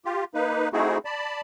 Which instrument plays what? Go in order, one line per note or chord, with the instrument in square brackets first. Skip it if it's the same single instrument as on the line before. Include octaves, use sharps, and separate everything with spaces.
[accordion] F4 G4
A#3 D#4 B4
A3 C4 D#4 E4 F#4 G#4
D5 A5 B5